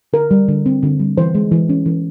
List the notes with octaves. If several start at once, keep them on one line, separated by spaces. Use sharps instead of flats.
D3 A#4
G3
D3
C4
D3
G3
E3 C5
G#3
E3
C#4
E3